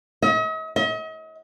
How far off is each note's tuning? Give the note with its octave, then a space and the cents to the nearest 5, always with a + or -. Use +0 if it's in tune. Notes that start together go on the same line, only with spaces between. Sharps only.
D#5 +45
D#5 +40